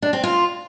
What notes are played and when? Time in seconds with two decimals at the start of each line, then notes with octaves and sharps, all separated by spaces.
0.02 D4
0.13 C4
0.23 F4